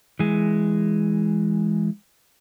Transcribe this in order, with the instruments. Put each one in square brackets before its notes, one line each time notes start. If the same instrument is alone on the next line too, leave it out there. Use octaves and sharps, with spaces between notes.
[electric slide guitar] E3 G#3